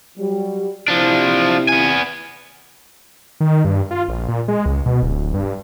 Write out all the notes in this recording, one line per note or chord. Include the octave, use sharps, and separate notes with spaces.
F#3 G3
C3 F3 D4 E4
B3 G#5
D#3
G2
F4
A#1
A#2
G#3
C#2
B2
D1
G2